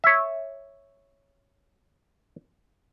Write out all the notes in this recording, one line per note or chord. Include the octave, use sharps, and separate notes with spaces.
C#5 E5